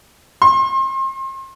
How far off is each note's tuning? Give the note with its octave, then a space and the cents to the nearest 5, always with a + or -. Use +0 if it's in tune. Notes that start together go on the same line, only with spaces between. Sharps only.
C6 +35